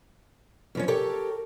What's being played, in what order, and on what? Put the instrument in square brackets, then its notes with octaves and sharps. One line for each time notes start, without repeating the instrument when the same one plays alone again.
[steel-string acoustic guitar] F#2 F3 C#4
[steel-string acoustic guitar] G4 A4 C#5 [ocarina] A#4